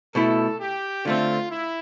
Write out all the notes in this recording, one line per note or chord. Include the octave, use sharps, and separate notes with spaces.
B2 A3 E4 A4
G4
D3 A3 C4 F4
E4